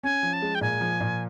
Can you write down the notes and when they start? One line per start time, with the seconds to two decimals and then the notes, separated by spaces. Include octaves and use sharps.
0.03 C#4 G#5
0.23 F3
0.33 A5
0.42 G#3
0.55 G5
0.61 A#2 G#5
0.81 F3
1.01 A#2